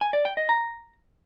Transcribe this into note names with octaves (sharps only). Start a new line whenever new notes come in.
G#5
D5
G5
D#5
A#5